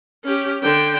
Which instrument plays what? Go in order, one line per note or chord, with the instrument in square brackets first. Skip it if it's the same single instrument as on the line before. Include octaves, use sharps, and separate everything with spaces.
[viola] C#4 G4
D3 G5